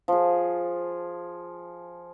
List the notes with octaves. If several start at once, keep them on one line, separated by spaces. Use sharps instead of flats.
F3 G#4